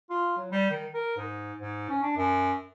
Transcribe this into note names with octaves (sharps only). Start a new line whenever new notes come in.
F4
F#3
G3
D#3
A#4
G#2
G#2
C#4
D4
F#2